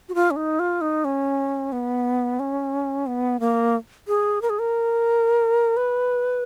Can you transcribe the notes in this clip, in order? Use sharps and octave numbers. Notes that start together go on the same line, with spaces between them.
F#4
F4
C#4
D#4
F4
D#4
C#4
B3
C#4
B3
A#3
G#4
A#4
G#4
A#4
B4